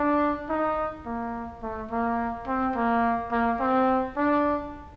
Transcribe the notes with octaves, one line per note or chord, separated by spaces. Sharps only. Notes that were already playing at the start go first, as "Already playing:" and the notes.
Already playing: D4
D#4
A#3
A3
A#3
C4
A#3
A#3
C4
D4